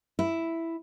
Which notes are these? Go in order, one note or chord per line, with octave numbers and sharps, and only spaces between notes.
E4